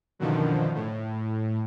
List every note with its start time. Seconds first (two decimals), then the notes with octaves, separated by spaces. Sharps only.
0.19 F#2 B2 D3 D#3 F3
0.75 A2